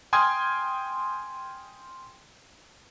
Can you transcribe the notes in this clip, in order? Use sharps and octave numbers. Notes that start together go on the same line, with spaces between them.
G5 G#5 C6 D#6 F6 G#6